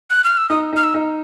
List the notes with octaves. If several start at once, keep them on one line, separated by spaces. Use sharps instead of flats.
F#6
F6
E6
D#4 D#6
D#4 F6
E6
D#4